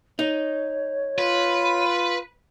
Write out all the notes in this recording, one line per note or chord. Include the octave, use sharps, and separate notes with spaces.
D#4 C#5
F4 B4